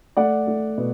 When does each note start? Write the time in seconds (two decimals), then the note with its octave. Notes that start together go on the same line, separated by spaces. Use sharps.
0.17 A3 D5 F#5
0.47 A3
0.78 B2